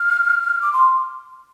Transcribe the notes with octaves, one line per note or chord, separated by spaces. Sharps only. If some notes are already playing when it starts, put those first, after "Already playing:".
Already playing: F6
D6
C6